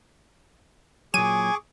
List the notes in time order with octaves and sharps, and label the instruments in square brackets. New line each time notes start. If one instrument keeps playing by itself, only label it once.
[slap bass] A#2 F#3 [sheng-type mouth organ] G#4 C#6 D6 [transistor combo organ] G#5 [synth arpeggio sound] D#7